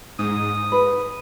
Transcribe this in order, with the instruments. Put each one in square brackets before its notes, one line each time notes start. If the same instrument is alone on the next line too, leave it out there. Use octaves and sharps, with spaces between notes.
[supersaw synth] G#2 [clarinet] D#6
[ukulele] B4